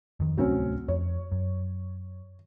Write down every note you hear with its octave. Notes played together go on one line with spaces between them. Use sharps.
F2 D#3
D1 C2 F#3 A3 C4 C#4
F2 C#5
F#2